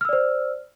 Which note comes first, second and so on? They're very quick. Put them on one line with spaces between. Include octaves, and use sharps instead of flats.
F6 E6 D5 C5